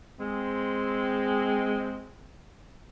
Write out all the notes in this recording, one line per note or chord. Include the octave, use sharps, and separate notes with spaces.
G#3 C4